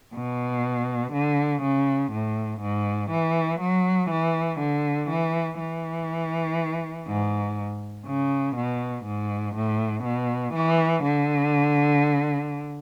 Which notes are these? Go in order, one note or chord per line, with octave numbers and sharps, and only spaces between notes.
B2
D3
C#3
A2
G#2
E3
F#3
E3
D3
E3
E3
G#2
C#3
B2
G#2
A2
B2
E3
D3